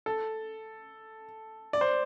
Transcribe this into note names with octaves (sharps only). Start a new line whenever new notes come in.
A4
D5
C5